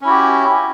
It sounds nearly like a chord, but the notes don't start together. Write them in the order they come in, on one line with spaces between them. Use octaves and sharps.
C#4 E4 F#4 G4